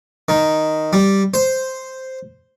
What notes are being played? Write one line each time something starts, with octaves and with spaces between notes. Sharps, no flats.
D#3
G3
C5